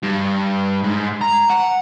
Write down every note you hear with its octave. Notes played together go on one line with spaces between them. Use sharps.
G2
G#2
A#5
F#5